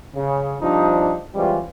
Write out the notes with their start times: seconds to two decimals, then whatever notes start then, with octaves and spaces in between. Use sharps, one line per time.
0.15 C#3
0.61 C3 F3 G3 D4 D#4
1.35 E3 G3 G#3 C4 C#4 F4